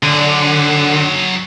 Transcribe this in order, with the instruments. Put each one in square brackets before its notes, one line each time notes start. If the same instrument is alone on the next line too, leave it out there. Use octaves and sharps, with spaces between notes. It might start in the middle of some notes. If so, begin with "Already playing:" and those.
[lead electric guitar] D3 [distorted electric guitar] F#3 G#4